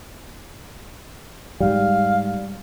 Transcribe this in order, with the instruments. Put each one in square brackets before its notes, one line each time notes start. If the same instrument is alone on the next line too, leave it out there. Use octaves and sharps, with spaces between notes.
[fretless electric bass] G#2 G3 [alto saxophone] F5